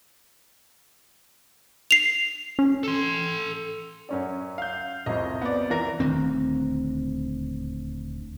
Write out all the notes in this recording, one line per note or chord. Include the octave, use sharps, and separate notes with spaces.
C7 F7
C#4
A4 C6
F#2 C#4 D5
F5 G6
C2 F2 C3 D#5
B3 D5
E3 A#4 A#6
D#1 D2 D#3 C4